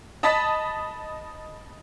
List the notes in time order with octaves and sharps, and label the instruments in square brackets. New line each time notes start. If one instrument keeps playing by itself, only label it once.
[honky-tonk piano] D#5 A5 B5 D#6 A6 B6